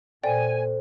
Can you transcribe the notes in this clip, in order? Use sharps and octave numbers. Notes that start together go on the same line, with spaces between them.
A#2 A4 C5 D5 G5 G#5